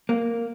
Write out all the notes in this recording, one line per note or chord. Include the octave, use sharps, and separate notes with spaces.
A#3